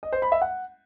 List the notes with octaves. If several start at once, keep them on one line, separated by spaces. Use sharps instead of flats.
D#5
C5
B5
E5
F#5